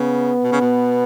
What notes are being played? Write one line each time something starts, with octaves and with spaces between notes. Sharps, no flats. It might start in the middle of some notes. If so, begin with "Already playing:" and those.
Already playing: C#3 B3
B2
C#3
B2